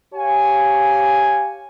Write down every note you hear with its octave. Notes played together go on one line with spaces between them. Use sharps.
G4 C#5 F5 G#5